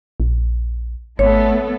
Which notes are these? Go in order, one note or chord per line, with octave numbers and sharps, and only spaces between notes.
A#1
G#1 A3 B3 A4 C#5